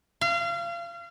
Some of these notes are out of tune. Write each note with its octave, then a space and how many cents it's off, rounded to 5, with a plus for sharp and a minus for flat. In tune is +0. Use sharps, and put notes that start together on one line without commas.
F5 -30